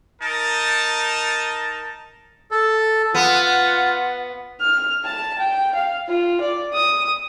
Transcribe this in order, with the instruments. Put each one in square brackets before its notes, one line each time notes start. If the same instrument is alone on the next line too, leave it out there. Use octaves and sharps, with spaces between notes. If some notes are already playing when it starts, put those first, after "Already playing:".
[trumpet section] D#4 A#4 A5
[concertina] A4
[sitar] B3 [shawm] F4 [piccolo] F#5
[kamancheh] F6
A5
G5
F5
F4
D5
D#6